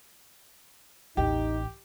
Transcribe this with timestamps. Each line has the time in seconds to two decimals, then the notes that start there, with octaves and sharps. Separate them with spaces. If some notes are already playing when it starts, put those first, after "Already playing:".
1.17 A1 D#2 D#4 G4